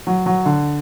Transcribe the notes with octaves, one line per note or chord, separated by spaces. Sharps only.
F#3
F#3
D3